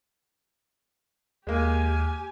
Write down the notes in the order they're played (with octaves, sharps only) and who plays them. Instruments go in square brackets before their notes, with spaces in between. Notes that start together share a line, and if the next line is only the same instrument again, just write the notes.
[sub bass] D#2 [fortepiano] G#3 A#3 [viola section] G4 G#5